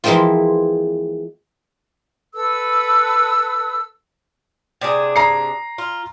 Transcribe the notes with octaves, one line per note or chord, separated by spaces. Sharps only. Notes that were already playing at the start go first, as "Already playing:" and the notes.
E3 F3 G#3 A#3 C4 F4
A4 B4 E6
C3 D4 G#4
A#5 C7
F4